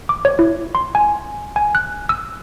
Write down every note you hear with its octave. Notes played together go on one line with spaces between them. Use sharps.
D6
C#5
E4
C6
G#5
G#5
F#6
E6